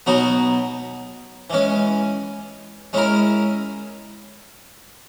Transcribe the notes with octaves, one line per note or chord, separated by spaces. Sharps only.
B2 F#3 B3 D#4 F#4
E3 G#3 C#4
G#3 C#4 E4 A#4